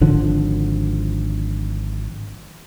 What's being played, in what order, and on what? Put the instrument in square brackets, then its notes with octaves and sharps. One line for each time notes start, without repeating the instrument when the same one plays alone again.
[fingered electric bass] G#1 D3 F3